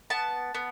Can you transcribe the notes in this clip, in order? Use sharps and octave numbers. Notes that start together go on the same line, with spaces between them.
B3 A5
B3